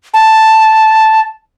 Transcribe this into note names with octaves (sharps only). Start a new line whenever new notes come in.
A5